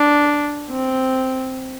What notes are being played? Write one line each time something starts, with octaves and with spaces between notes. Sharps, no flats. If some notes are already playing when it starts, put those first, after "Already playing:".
Already playing: D4
C4